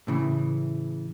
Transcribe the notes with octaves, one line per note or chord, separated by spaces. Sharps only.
A2 C#3 E3